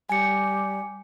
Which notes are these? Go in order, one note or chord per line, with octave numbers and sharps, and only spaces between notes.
G3 G#5 C#7